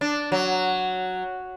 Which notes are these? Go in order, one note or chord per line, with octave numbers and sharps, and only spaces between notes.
D4
F#3